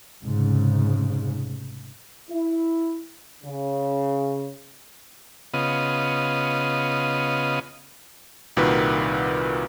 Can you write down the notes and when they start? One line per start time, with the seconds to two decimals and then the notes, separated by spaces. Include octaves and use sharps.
0.24 F1 G#2 C#3
2.29 E4
3.44 C#3
5.54 C#3 B3 F4 D#5
8.57 C2 A#2 D#3 F#4 B4